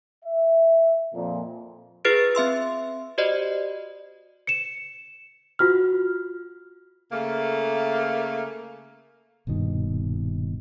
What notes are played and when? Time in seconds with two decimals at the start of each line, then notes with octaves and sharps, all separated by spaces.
0.25 E5
1.14 F2 A#2
2.05 F4 G#4 B4 F6 A6 D7
2.35 C4 E5 C6 E6
3.18 F#4 G4 C5 D5 D#5
4.47 C#7 E7
5.59 F4 F#4 F6
7.11 C#3 A3 A#3
9.47 D#1 G2 B2 D#3